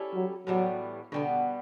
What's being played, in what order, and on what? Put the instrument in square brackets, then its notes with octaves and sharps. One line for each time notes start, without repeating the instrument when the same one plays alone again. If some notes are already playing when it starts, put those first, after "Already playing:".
Already playing: [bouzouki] G3 C#4 E4 A4
[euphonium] F#3
[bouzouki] A2 E3 G3 B3 [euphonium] F#3
[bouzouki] B2 G3 B3 [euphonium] D3